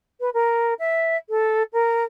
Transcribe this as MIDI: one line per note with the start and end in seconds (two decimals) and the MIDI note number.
0.20 0.29 71
0.33 0.73 70
0.79 1.16 76
1.29 1.63 69
1.73 2.04 70